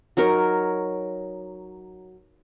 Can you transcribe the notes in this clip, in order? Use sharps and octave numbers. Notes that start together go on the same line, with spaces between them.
F#3 D#4 A#4 C#5